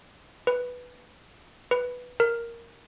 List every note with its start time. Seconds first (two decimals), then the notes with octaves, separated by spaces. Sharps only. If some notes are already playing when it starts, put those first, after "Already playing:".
0.47 B4
1.71 B4
2.20 A#4